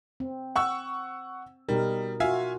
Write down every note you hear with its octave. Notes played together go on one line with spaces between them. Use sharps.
C4
F#5 C#6 E6
B2 G3 D#4 A#4
F4 F#4 E5 F5 G#5